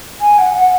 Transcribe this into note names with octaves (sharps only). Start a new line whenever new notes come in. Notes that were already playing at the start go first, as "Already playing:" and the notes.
G#5
F#5
F#5